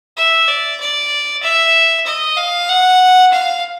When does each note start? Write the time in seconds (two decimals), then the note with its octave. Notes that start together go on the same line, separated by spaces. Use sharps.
0.17 E5
0.48 D5
0.80 D5
1.43 E5
2.06 D#5
2.38 F5
2.69 F#5
3.32 F5